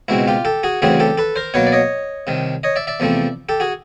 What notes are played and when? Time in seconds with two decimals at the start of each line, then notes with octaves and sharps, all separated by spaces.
0.08 C#2 B2 G#3 C4 E4 F#4
0.27 F4 G4
0.45 G4 A4
0.63 F#4 G#4
0.82 D2 C#3 E3 G3 C4 F#4 G#4
1.00 G4 A4
1.18 A4 B4
1.36 A#4 C5
1.54 B2 F#3 A#3 B4 C#5
1.67 D5
1.72 C#5 D#5
2.27 C2 C3 D#3
2.63 C#5 D#5
2.76 D5 E5
2.87 D5 E5
3.00 E2 C3 F3 A3 C4
3.49 G4 A4
3.60 F#4 G#4